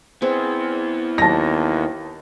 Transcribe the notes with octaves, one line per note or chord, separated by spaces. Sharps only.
E3 B3 C4 G#4
D#2 A5 A#6